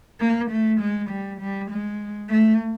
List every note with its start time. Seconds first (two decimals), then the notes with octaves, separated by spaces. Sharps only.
0.20 A#3
0.50 A3
0.80 G#3
1.10 G3
1.40 G3
1.70 G#3
2.30 A3